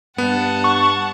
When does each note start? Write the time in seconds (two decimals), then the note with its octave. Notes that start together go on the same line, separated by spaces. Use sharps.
0.18 G2 B3 F#5 A5
0.64 C#6